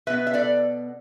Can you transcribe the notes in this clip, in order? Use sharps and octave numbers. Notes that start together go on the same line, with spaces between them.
B2 B3 B4 E5
E5
A4 D5